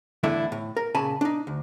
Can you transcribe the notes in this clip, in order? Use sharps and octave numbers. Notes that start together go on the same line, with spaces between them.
E2 A2 D3 A3 D4 E4
A2
A#4
A#2 C#3 G#5 A5 B5
D4 D#4
D2